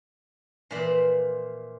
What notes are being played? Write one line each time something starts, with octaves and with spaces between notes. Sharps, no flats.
A#2 E3 F3 C5 D5 B5